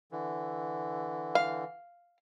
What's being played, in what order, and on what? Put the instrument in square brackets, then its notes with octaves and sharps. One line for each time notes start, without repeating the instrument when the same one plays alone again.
[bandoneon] D3 E3
[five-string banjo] F5